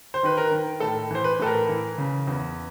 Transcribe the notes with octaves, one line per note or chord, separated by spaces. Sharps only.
C5
D#3 B4
A#4
D#3
A2 A4
E3 C5
B4
A2 A4
A#4
E3
C#3
E2